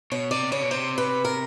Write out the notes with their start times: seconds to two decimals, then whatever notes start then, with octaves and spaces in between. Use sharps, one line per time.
0.12 B2 C#5
0.31 C3 D5
0.51 C#3 C#5
0.62 B2
0.71 C3 C5
0.98 B4
1.25 A#4